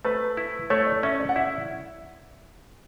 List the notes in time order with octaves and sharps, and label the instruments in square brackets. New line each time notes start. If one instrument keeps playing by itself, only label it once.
[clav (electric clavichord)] A3 [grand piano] B4
[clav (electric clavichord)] E4
[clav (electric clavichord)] A3 [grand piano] C#5
[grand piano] D5
[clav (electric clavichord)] C#4 [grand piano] E5
[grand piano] D5
F#5
[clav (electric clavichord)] E4 [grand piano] E5